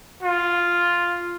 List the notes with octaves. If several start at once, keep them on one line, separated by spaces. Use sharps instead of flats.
F4